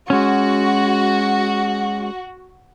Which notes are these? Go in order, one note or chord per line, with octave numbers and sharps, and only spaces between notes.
G#3 C#4 F#4